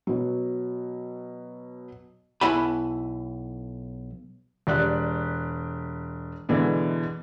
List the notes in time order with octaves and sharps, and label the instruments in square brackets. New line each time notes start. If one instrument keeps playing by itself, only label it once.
[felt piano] B2 F#3
[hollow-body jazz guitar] B1 E4 F#5 G#5 B5
[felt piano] E1 G4 D5 F#6
B2 D3 E3 G#3